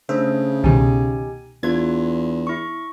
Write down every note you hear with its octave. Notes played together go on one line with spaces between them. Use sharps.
C#3 A3 D4 C5 E5
C2 B2 D#3 D#4 G4 G#5
E2 D4 F4 G#6
E4 C#6